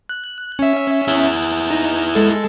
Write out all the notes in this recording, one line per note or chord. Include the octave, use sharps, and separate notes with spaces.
F#6
C#4 E5
E4 G#4
D#4
G#3 A4